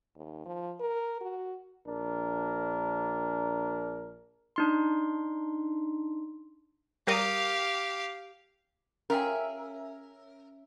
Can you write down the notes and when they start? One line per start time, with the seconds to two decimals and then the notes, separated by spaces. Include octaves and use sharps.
0.16 D#2
0.46 F3
0.80 A#4
1.21 F#4
1.86 A#1 D4 A#4
4.56 D4 D#4 C6
7.07 G3 G4 A#4 F5 D#6
9.10 C#4 F4 G4 G#4 A#4 E5